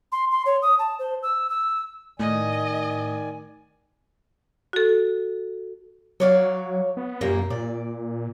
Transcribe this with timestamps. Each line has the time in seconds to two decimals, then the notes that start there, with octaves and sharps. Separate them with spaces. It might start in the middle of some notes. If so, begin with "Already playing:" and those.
0.12 C6
0.31 C6
0.46 C#5
0.62 D#6
0.79 A5
0.99 C5
1.23 E6
1.50 E6
2.20 A2 D#3 D5 D#5 G#5
4.73 F#4 A4
6.20 F#3 C#5 D5 F5
6.97 B3
7.21 F#2 A#2 G3 A#3
7.50 A#2 D5